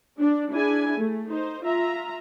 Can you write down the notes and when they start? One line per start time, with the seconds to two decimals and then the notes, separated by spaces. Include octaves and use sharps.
0.18 D4
0.52 D4 E4 G#4 G#5
0.98 A3
1.28 D#4 C5
1.64 F4 E5 A#5